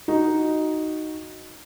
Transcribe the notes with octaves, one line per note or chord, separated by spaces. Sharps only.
D#4 F#4